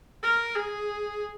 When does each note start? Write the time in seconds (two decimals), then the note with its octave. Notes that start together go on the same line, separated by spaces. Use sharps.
0.23 A#4
0.55 G#4